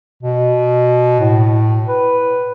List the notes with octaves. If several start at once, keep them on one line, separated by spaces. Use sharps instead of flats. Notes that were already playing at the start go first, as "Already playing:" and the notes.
B2
A2
B4